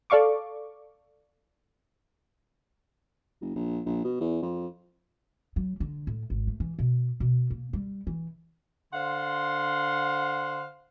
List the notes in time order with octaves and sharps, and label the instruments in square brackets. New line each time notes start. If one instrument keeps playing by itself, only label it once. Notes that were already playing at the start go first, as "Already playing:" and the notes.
[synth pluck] A4 D5 F5 C#6 D6
[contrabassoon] F#1
A#1
A#1
B2
E2
F2
[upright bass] F#3
D3
A2
G#1
A3
E3
B2
B2
A#3
G3
E3
[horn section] D3 C5 F5 F#5 C6